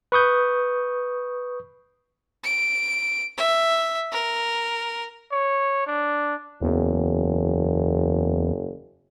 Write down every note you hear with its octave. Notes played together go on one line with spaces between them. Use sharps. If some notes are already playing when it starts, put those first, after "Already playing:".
B4 C#6 D#6 G6
D7
E5
A#4
C#5
D4
F#1 E2